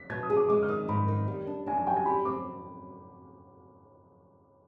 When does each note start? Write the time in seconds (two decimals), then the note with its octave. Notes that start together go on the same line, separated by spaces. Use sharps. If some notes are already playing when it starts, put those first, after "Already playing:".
Already playing: B6
0.10 B2 G#6
0.23 D#6
0.30 G#4
0.37 D6
0.49 G#3 D6
0.63 F6
0.69 D#3 D#6
0.88 G#2 B5
1.08 D#3
1.28 G3
1.47 D4
1.66 D4 G#5
1.77 G#5
1.86 G3 G5
1.96 G#5
2.06 G4 B5
2.25 C4 D6